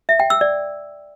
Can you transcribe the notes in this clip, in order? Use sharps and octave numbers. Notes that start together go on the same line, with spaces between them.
E5
G5
E6
D5